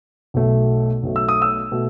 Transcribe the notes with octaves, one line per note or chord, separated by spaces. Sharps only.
B1 B2 A3
B1 B2 A3
E6
D#6
E6
B2 A3